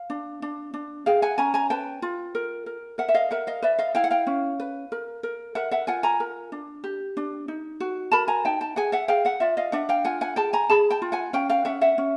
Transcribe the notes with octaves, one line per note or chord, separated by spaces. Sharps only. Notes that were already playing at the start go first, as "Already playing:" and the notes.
Already playing: F5
D4
D4
D4
G#4 F5 G5
F#5 G#5
C#4 G#5 A#5
G#5 A#5
B4 G5 A5
F4
A#4
A#4
A#4 E5 F#5
E5
D#5 F5
A#4 E5 F#5
D#5 F5
B4 D5 E5
D#5 F5
E4 F5 G5
F#5
F5 G5
C#4
B4
A#4
A#4
A#4 E5 F#5
E5 F#5
F4 F#5 G#5
G#5 A#5
A#4
D4
G4
D4
D#4
F#4
A#4 A5 B5
G#5 A#5
D#4 G5 A5
G5 A5
G#4 F#5 G#5
E5 F#5
G#4 F5 G5
E5 F#5
F4 D5 E5
D#5 F5
D4 E5 F#5
F5 G5
F4 F#5 G#5
F#5 G#5
G#4 G5 A5
G#5 A#5
G#4 A5 B5
G5 A5
F4
F#5 G#5
C#4 F5 G5
F5 G5
C#4 E5 F#5
E5 F#5
C#4